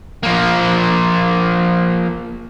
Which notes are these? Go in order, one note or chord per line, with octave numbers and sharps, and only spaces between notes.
F3 A#3